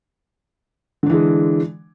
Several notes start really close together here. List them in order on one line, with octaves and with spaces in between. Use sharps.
D3 D4 E3 G#3